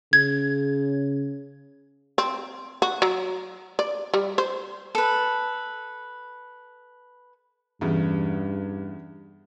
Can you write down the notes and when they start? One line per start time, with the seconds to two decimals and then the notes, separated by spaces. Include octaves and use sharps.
0.13 C#3 G#6
2.18 C4
2.82 F#4
3.02 F#3
3.79 D5
4.14 G3
4.38 C5
4.95 A4 B4
7.81 E2 G2 C#3